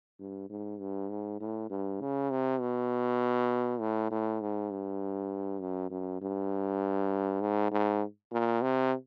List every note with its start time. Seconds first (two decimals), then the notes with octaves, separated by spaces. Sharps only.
0.20 G2
0.50 G#2
0.80 G2
1.10 G#2
1.40 A2
1.70 G2
2.01 C#3
2.30 C3
2.60 B2
3.80 A2
4.10 A2
4.41 G#2
4.71 G2
5.61 F#2
5.91 F#2
6.22 G2
7.41 G#2
7.72 G#2
8.32 A#2
8.62 C3